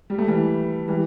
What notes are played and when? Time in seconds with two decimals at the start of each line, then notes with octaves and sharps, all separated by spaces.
0.10 G3
0.18 A3
0.28 E3 G3
0.88 E3 G3